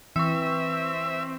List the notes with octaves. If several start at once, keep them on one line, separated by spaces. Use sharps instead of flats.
E3 C4 E5 C#6 E6